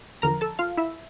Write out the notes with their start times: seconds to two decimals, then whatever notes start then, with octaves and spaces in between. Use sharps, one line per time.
0.22 E2 D3 F3 A#4 A#5
0.41 A4 A5
0.59 F4 F5
0.77 E4 E5